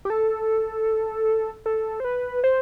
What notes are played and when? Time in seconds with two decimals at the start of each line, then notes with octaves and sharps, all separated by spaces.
0.05 G4
0.10 A4
1.66 A4
2.00 C5
2.04 B4
2.44 C5